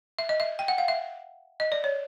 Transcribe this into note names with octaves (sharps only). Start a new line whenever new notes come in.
E5
D#5
E5
G5
F#5
F5
E5
D#5
D5
C#5